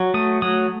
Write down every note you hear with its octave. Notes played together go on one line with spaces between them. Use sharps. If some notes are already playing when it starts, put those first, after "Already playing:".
Already playing: F#3
A3 D#6
F#3 D#6